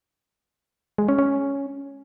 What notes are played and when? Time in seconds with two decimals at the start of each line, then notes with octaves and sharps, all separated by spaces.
0.98 G#3
1.09 C#4
1.19 C#4